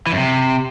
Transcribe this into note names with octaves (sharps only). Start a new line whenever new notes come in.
E3
F#2
C3